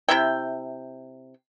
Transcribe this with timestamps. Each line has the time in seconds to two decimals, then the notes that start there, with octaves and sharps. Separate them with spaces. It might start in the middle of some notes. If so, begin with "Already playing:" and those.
0.09 C3 E4 E5 G5